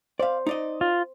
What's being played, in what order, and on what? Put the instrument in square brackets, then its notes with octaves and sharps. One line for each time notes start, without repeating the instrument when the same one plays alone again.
[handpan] C5 [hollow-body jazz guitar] D5 F5
[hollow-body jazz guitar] D#4 D5 D#5
[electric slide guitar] F4